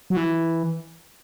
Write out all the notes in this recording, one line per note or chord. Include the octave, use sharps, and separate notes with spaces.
F#3
E3